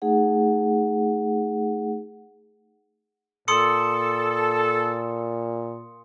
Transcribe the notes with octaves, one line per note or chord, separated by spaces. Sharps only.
A3 D#4 G#4 F#5
A#2 A4 C6 D#6 C#7